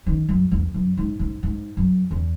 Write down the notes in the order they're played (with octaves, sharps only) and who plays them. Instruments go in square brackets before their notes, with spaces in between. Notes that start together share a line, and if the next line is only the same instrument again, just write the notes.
[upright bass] D#3
F#2
E2
F#2
G#2
G#2
G#2
F#2
E2